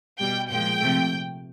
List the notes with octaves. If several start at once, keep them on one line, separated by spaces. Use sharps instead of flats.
B2 G3 G5
A#2 F3 G#3 G5
C3 F3 A3